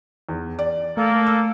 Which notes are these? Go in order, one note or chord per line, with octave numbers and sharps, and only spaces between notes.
E2
D5
A3 A#3 A4
E6